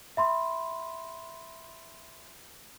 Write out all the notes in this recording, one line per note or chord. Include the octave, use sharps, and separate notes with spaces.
E5 B5 C6